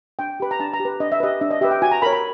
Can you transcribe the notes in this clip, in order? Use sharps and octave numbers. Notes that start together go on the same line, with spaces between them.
D4 G5
G4 B4 B5
A#5
D4 A5
A#5
G4
B4
D4 D#5
E5
G4 B4 D#5
D4 E5
D#5
G4 B4 E5
G5
F#4 G#5
A#5
A#4 C#5 B5
B5